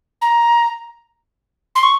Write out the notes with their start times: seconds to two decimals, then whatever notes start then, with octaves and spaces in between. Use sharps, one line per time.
0.22 A#5
1.75 C6
1.83 C#6